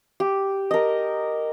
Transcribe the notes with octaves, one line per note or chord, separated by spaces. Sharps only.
G4
A#4 D#5